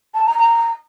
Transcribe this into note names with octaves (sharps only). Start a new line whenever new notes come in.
A5
A#5
A#5